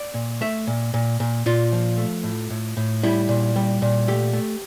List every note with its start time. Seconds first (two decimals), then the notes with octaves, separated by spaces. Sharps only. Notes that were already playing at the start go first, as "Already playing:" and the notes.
Already playing: D5
0.14 A#2
0.41 A3 E5
0.67 A#2
0.94 A#2
1.20 A#2
1.46 A#2 F4
1.72 F3
1.98 A3
2.24 A2
2.50 A2
2.77 A2
3.03 G3 E4
3.29 A#2
3.56 G3
3.82 A#2
4.07 A3 G4
4.33 A3